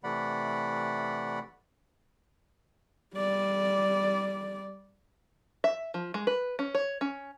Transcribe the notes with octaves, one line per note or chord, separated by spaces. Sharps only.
C3 E3 A3 D5 F#5 B5
G3 D5
E5
F3
G#3
B4
C#4
C#5
C#4